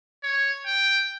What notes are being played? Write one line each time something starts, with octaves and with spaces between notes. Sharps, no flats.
C#5
G5